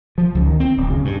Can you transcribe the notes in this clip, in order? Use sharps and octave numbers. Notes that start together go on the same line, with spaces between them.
F3
C#2
D#3
C4
D1
C#3
G2